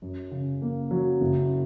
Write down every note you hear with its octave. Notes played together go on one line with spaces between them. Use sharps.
F#2
C#3
A#3
F#3
F#1